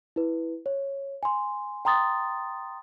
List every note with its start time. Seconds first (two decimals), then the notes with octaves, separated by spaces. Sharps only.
0.16 E4 B4
0.66 C#5
1.23 G#5 C6
1.85 G5 A#5 C6 D#6 A6